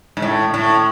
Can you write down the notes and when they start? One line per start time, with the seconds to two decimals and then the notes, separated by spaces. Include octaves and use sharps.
0.17 G#2
0.22 A2
0.54 A2